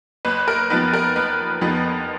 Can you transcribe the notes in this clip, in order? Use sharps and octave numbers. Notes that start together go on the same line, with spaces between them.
F#1 B4
A#4
F2 F3 B3 D#4 B4
A#4
F#1 B4
F2 F3 B3 D#4